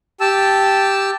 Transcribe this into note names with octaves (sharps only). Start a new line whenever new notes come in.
G4 A5 E6